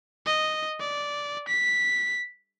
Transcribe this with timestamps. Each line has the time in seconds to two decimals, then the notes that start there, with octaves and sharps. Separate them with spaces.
0.26 D#5
0.80 D5
1.48 B6